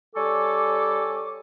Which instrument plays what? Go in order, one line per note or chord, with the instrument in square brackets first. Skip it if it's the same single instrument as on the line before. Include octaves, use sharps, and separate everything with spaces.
[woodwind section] G3 C#4 A4 G#5 C#6 D6